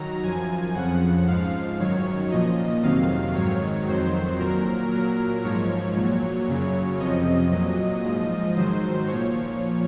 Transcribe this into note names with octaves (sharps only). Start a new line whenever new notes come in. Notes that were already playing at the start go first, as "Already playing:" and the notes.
Already playing: D#3 F#3 A#5
F#2 F3 G#5
F2 C#3 F3 F#5
G#2 F3 F5
F#2 D#3 F#3 C#5
A#2 F3 D#5
F2 C3 D#3 F#3 F5
G#2 D#3 F#3 C#5
F2 D#3 F#3 C5
A#2 A#4
F#3
A#2 F#3 A#4
G#2 F3 C#5
A#2 F#3
F#2 C#3 F#3
F2 C3 F3 D#5
A#2 F#3
G#2 F3
G#2 D#3 F#3 C5
A#2 F3 C#5